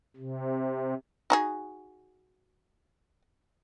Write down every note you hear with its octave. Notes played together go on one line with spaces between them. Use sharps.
C3
D#4 F#4 G#4